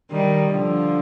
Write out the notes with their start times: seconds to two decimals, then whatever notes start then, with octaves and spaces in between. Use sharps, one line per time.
0.11 D#3 G3
0.52 D3 F3